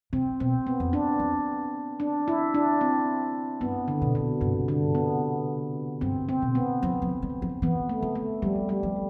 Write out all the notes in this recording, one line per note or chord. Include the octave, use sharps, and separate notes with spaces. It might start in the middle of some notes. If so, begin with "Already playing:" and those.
C3 C4
B2 C4
B3
F2
D4
F2
D4
E4
D4
C4
G2 B3
D3
B2
B2
G2 C3
D3
B3
G2 C4
C4
B2
B3
F3
F3
G3
F3
E3 B3
A3
D3
A3
F3 G3
G3
F3